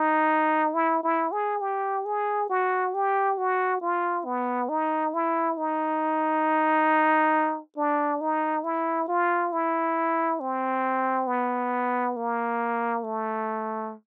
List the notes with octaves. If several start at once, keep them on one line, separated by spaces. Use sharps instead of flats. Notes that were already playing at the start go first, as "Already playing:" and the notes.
Already playing: D#4
E4
E4
G#4
G4
G#4
F#4
G4
F#4
F4
B3
D#4
E4
D#4
D4
D#4
E4
F4
E4
C4
B3
A#3
A3